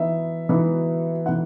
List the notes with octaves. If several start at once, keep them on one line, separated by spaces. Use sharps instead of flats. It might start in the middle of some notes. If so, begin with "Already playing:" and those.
Already playing: E3 B3 D#4 E5
E3 B3 D#4
E3 B3 D#4 F#5